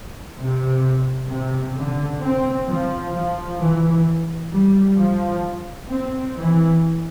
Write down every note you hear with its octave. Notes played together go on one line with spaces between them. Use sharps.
C3
C3
D3
C4
F3
F3
E3
G3
F3
C4
E3